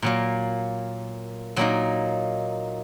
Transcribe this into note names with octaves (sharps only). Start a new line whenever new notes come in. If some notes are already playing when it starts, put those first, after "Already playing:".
A#2 F#3 A#3
A#2 F#3 A#3 D#4